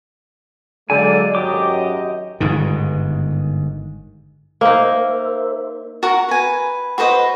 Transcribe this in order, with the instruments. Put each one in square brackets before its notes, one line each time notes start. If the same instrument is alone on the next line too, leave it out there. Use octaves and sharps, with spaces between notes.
[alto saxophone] D3 [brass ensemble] F#3 G#3 A#3 [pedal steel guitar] D5 G#5
[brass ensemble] G#1 F#2 D#5 [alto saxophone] F#3 [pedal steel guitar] G4 D6
[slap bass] G1 G#2 D#3
[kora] A#3 D#4 [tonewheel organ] A#4 C5 E5
[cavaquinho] F#4 A#4 F#5 A#5
B4 G#5
F#4 B4 C5 D#5